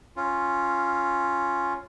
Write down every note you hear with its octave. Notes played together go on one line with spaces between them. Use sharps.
C#4 F4